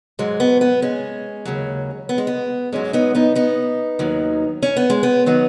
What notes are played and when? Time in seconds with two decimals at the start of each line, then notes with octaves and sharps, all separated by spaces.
0.19 G#2 F#3 G#3
0.40 B3
0.61 B3
0.82 G#3 C#4
1.45 D#2 C#3 F#3
2.09 B3
2.18 G#3
2.27 B3
2.72 G#2 F#3 G#3 C#4
2.93 B3 D#4
3.15 B3 D#4
3.35 B3 D#4
3.99 D#2 D#3 F#3
4.63 C#4
4.77 B3
4.90 G#3
5.03 B3
5.26 D#3 F#3 B3